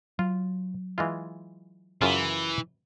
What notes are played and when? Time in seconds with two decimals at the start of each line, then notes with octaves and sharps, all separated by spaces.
0.19 F#3 F4
0.98 E3 G#3 F4
2.02 F#2 C#3 E3 F4